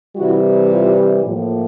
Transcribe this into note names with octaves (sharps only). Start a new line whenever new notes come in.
C3 E3 G3 E4 F#4
F4 G4
A2 F3 A#3